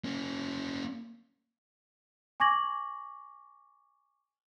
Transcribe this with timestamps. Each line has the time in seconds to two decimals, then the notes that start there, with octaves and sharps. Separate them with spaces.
0.04 A#3 C#4
2.40 G#5 C#6 D6 G#6 A#6 F#7